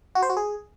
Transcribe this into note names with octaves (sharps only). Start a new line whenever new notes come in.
F#4
C5
F#4
G#4